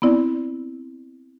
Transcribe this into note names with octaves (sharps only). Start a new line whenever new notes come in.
B3 C4 E4 D5